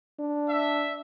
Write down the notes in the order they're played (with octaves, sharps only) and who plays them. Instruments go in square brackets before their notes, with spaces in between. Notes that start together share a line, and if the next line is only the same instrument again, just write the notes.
[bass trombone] D4
[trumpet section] E5